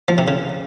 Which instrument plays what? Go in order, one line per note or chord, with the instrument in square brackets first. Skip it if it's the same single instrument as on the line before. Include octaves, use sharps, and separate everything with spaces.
[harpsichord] F3
C3
C#3